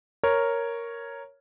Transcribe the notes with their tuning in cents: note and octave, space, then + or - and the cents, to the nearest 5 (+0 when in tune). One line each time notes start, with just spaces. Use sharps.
A#4 +0 C#5 +0